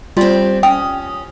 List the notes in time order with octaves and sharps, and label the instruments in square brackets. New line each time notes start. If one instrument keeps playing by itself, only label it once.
[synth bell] G3 F4 D5 [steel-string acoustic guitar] C4 G4
[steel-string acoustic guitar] C#4 [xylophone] G5 [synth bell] D#6